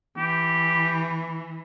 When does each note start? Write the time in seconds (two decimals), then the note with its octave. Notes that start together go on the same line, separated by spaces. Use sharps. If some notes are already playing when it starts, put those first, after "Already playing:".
0.18 E3 G4